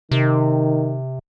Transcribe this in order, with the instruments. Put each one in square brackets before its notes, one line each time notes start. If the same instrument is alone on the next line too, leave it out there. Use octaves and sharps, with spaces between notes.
[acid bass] C3 [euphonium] D#3